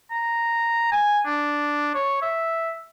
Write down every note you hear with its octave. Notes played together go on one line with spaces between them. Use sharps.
A#5
G#5
D4
C#5
E5